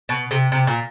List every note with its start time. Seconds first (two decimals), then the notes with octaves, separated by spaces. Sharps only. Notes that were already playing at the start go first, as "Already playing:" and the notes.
0.09 B2
0.31 C3
0.52 C3
0.67 A#2